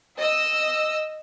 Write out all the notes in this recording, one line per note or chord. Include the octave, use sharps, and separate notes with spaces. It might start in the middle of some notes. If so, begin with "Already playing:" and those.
D#5 E6